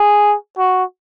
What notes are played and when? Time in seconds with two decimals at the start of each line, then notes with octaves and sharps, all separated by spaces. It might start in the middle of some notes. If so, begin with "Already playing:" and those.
Already playing: G#4
0.58 F#4